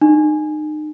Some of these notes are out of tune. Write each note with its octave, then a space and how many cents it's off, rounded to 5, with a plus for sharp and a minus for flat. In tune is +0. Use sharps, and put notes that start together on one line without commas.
D#4 -35